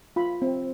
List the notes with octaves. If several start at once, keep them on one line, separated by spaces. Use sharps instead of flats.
F4 B5
C4